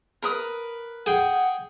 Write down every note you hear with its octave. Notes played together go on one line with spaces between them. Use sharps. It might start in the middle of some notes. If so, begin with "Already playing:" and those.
A#4 B4 D#6
G#4 F#5 G5